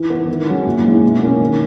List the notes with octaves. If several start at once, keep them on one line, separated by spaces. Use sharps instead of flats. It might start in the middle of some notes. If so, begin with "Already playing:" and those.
Already playing: E3
B3 E4
D#3
F#3 C#4 E4
A#2
G#3 C#4 E4
B2
A#3 C#4
D#3